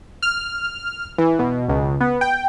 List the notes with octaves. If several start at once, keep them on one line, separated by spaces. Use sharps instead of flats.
F6
E3
B2
C#2
B3
G5